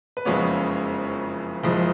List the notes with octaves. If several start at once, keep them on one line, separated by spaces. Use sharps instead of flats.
B4
F#1 F2 C#3 G#3 B3 C#5
F#1 F2 F3 G#3